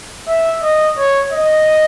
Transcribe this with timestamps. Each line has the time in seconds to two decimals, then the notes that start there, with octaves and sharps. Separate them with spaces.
0.28 E5
0.63 D#5
0.98 C#5
1.32 D#5